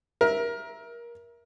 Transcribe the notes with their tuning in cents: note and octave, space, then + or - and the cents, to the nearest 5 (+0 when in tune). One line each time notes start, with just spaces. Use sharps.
A#4 +20 E5 +0